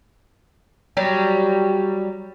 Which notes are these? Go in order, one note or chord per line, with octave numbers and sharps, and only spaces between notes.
F#3 G3